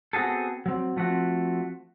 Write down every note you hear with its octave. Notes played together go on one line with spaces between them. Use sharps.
B3 C4 F#4 G#4 A4
F#3 C4
F3 A3 C4 F#4